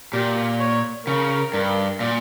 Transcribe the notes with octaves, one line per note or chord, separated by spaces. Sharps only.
A#2 G4
C#5
C#3 A#4
G2
A#2